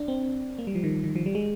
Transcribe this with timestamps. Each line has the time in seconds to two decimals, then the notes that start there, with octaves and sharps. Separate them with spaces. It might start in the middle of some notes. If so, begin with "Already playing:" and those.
Already playing: D4
0.08 C4
0.58 A#3
0.67 G3
0.75 F3
0.84 D#3
1.04 D#3
1.16 F3
1.26 G3
1.35 G#3